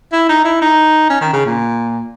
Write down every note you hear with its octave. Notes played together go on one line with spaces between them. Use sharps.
E4
D#4
E4
D#4
C#4
D#3
C#3
A#2